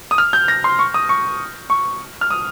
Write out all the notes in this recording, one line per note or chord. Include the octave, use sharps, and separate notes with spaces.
D#6
F6
G6
A#6
C6
C#6
D#6
C#6
C#6
F6
D#6